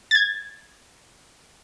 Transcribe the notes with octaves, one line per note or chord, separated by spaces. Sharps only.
G#6 A6